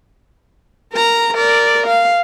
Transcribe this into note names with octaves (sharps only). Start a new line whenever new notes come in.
A#4 A#5
A#4 D5
F5